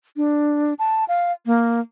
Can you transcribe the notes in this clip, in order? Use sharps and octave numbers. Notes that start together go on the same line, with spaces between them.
D4
A5
F5
A#3